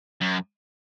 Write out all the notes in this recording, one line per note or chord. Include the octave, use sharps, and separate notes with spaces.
F#2